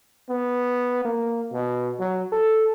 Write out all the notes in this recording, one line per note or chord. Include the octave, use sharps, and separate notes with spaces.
B3
A#3
B2
F#3
A4